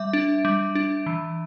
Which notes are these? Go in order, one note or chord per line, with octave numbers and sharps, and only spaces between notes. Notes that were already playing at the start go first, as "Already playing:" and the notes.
Already playing: G3 E5
D4
G3
D4
E3